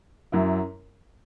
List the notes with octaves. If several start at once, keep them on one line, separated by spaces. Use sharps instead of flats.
F#2 F#3 E4